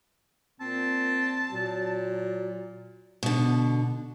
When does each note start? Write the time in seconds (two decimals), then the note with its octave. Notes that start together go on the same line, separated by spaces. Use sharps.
0.60 A#2 C4 A5
1.52 A#2 F#3
3.23 B2 D3